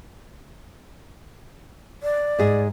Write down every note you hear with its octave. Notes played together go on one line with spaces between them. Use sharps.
D5
G#2 G#4